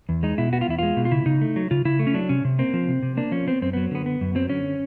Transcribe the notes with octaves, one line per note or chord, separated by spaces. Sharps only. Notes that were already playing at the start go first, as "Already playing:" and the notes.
E2
G#3 D#4
B2 E4
B3 F#4
F4
E2 E4
G#3 F4
B2
F4
C#3 E4
C#3 D#4
A3
F#3
C#3 F4
C#3 E4
A3
C#4
F#3 D4
C3 C#4
C3
A#3 C4
F3
C3
C3
A#3 D4
F3 C#4
B3 C4
F#2 C4
F#3 B3
D3 B3
B3
F#2
F#3 C4
D3 C#4